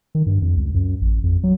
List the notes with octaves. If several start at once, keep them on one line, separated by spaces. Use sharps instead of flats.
D#3
G2
F2
C#2
F#2
A1
F2
F#3